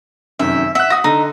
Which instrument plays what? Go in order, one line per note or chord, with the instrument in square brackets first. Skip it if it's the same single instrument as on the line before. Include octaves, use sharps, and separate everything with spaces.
[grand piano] F1 F#2 D#3 [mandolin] E5
[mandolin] E5 [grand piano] F#5 F#6
[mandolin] F#4 [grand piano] D#6 A#6
[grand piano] D3 [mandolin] D#4